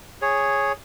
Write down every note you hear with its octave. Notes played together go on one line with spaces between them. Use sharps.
G#4 C#5